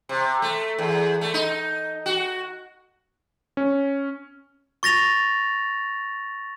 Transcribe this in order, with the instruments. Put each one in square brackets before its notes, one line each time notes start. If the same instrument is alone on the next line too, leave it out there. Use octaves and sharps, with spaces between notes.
[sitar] C3
A3
E2
A3
D#4
F#4
[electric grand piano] C#4
[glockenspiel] C#6 A6 A#6 F7